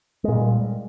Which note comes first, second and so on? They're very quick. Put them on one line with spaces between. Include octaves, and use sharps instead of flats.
G#3 A#2 G3